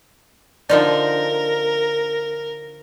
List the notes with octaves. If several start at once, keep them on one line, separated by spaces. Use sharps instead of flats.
D3 F3 D#4 A#4 D5